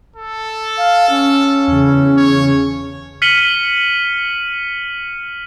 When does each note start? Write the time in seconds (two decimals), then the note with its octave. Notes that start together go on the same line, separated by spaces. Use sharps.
0.16 A4
0.78 F5
1.10 C#4
1.67 E2 C#3
2.17 C#5
3.22 F6 B6 C#7 D#7 F#7 G7